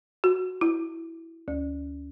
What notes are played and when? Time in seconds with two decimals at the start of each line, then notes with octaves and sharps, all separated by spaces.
0.24 F#4
0.61 E4
1.48 D2